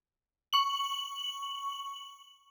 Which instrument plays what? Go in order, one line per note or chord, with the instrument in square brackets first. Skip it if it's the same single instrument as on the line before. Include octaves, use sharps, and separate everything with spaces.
[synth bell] C#6 F#7